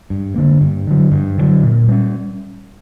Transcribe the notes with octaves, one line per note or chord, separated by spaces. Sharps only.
G2
D3 A#3
G2
D3 F#3
G2
D3 F#3
A#2
G3 C#4